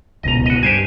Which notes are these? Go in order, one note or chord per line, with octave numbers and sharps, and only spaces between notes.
D1 C#2 B2 D#5 A#5
F#4 D#5
G2 G4 C5 G#5